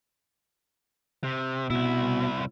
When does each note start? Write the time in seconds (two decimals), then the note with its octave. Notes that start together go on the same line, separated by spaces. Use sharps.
1.24 C3
1.70 C2 B2 E4